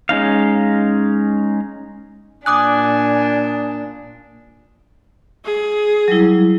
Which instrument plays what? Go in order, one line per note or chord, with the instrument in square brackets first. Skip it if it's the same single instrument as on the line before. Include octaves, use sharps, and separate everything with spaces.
[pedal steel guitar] G#3 C#4 D#4 F5
[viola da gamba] A#2 D4 [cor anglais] G#5 [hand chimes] D6 D#6 F#6
[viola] G#4
[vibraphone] F#3 G3 E4